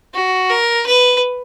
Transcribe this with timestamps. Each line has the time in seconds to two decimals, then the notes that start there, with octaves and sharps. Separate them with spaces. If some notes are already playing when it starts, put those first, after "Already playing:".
0.14 F#4
0.50 A#4
0.86 B4